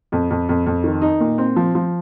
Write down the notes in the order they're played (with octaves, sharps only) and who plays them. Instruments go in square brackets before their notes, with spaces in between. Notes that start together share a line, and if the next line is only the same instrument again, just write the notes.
[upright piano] F2
F2
F2
F2
D#3
D#4
A#2
C4
F3
F3